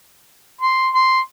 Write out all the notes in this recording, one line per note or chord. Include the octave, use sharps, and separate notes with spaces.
C6
C6